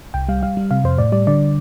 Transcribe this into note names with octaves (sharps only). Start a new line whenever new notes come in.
C2 G5
G3 F5
G3 F5
G3
C3 F5
F2 C5
A2 D5
G3 D5
D3 D5